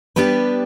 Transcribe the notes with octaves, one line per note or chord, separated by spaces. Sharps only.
G3 B3 D4 G4 B4